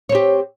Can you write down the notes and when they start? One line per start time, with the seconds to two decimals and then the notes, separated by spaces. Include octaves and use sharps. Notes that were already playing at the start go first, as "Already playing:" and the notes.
0.09 C#5
0.12 C4
0.15 G4